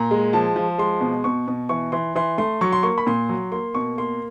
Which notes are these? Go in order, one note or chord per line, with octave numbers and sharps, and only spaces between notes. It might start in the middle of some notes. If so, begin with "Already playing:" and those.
Already playing: A#2 A#5
G#3
F3 A5
F3
G#3 C6
B2
B2 C#6
B2
E3 C#6
E3 C6
E3 C6
A3 C6
F#3 C#6
C6
A#3 C#6
B5
A#2 C6
F#3
A#3 C6
B2 C#6
A#3 C6